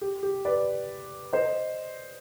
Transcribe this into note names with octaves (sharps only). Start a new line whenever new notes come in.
G4
G4
B4 D5
C5 D#5